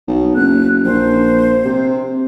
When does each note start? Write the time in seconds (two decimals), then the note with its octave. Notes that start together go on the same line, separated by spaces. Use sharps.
0.07 B1
0.36 F#1 F#6
0.85 A#1 C5
1.65 C3